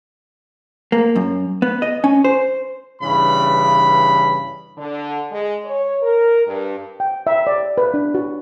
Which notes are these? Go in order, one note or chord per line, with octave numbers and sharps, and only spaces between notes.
A#3
F#2
B3
D#5
C#4
C5
G2 C#3 E3 B5
D3
G#3
C#5
A#4
G2
G5
E5
D5
B4
D4
F#4